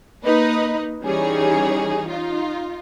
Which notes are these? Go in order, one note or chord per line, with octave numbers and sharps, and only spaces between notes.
A#3 D#4 B4 D#5
E3 G3 C#4 D#4 G#4 C#5
D#4 F4